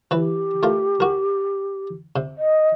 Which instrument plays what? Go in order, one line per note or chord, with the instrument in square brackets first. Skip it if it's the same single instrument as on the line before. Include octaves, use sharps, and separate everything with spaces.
[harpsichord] E3 B4 [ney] G4
[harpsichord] A3 F4 A#4
F#4 A#4
C3
[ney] D#5